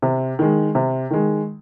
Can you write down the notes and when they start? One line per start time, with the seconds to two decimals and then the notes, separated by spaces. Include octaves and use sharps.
0.02 C3
0.39 D#3 G#3
0.75 C3
1.11 D#3 G#3